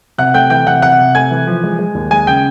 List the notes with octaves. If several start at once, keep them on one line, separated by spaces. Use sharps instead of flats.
C3 F#5 F#6
A3 G5 G6
E3 G5 G6
C3 F#5 F#6
C3 F#5 F#6
C3
A3 G#5 G#6
E3
F3
G#3
G#3
D#2
G#3 G#5 G#6
C#3 G5 G6